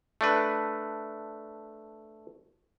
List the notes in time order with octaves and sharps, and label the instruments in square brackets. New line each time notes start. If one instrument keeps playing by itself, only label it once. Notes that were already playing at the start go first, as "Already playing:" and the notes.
[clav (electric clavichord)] A3 D4 B4